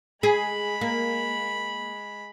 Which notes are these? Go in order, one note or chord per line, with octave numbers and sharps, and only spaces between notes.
G#3 G#4 B5
A#3